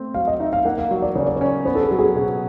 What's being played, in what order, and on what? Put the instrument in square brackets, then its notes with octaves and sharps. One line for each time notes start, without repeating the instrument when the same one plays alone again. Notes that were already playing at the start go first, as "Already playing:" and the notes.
Already playing: [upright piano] A3 C4
[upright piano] F#3 [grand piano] F5
[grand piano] D#5
[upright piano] D#4 [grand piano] E5
[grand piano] F5
[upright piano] A#3 [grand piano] F#5
[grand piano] F5
[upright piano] F#3
[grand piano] D5
[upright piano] C#3 [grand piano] C#5
[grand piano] D5
C#5
[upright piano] C#4
[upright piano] B3 [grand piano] C5
[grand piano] A4
G#4
[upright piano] F#3
[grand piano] G#4
[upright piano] B2 [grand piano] G#4